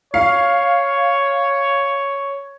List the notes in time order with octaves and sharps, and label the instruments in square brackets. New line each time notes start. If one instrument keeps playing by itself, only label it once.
[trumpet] C#5 [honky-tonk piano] F5